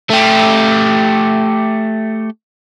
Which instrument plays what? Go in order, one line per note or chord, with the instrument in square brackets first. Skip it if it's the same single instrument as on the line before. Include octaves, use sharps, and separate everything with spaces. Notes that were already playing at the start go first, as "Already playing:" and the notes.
[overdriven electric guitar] A3 G4